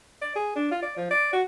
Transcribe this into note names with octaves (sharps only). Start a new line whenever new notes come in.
D5
G#4
D4
F4
D5
F3
D5
F#4